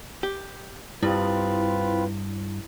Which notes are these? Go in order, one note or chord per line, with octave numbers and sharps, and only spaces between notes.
G4
G2 C4 E4 F4 B4